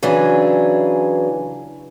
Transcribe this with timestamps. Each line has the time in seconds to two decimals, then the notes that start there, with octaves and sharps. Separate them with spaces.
0.03 C#3 E3 F#3 D4 G#4